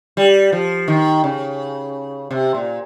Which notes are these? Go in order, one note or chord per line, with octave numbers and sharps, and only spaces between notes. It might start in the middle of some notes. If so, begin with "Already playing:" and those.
G3
F3
D#3
C#3
C3
A#2